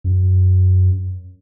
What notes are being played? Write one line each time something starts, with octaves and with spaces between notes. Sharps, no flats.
F#2